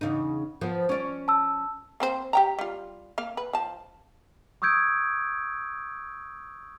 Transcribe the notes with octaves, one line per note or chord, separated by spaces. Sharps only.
E2 C#3 D#4
F3 B3
C#4 D5
A5 E6
A#3 C4 C5
G4 G5 A#5
G3 F4
A#3 F5
B4
F3 A5
C#6 D#6 E6 G6 G#6 D7